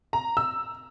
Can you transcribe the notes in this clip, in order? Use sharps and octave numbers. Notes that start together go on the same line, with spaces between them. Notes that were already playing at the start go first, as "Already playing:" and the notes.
A#5
E6